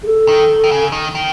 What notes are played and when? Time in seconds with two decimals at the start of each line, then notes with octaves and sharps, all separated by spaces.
0.03 G#4
0.07 A4
0.28 D#3
0.64 D#3
0.71 C#3
0.92 D#3
1.15 D#3